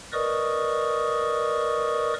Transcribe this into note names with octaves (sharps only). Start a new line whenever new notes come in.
A#4 B4 D5 D#5 C#6 D#6